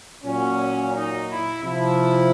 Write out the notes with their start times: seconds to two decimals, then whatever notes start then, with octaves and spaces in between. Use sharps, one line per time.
0.24 A#2 F#3 C#4
0.94 D#4
1.29 E4
1.63 C3 F3 E4